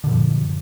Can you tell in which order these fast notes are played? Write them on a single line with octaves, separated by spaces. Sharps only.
D3 A#2 F3 F#2